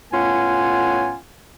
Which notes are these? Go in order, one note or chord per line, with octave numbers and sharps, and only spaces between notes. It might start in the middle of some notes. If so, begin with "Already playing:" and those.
A2 B3 C#4 F4 F#5 G#5